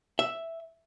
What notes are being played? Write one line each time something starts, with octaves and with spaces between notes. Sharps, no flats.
E5